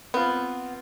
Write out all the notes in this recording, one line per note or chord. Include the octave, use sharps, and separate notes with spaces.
B3 C4 F4